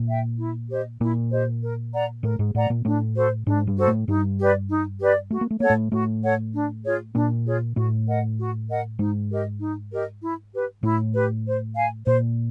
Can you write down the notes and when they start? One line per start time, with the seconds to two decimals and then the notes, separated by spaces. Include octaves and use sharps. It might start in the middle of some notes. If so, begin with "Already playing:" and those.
Already playing: A#2 A#3
0.08 E5 G5
0.39 E4
0.70 G4 C5 D#5
1.01 A#2 A#3 E4
1.31 G4 C5 D#5
1.62 A#4
1.93 D5 F#5 A#5
2.23 A2 A3 A#4
2.39 G#2 G#3
2.55 A2 A3 D5 F#5 A#5
2.70 A#2 A#3
2.85 A2 A3 D4
3.15 F#4 A4 C5
3.47 G#2 G#3 D4
3.67 G2 G3
3.77 F#4 A4 C5
3.87 A2 A3
4.08 G2 G3 D#4
4.38 G4 B4 D5
4.69 D#4
5.00 G4 B4 D5
5.30 A3 F#4
5.41 A#3
5.51 A3
5.60 A#3 A4 C#5 F#5
5.70 A2 A3
5.92 A2 A3 F#4
6.23 A4 C#5 F#5
6.53 D4
6.84 F4 G#4 C#5
7.15 A#2 A#3 D4
7.46 F4 G#4 C#5
7.76 A2 A3 F#4
8.07 A#4 D#5 F#5
8.38 F#4
8.69 A#4 D#5 F#5
8.99 G#2 G#3 D#4
9.30 G4 A#4 D#5
9.61 D#4
9.92 G4 A#4 D#5
10.22 E4
10.53 G4 B4
10.83 A2 A3 E4
11.14 G4 B4
11.45 C5
11.76 F5 G#5
12.07 A#2 A#3 C5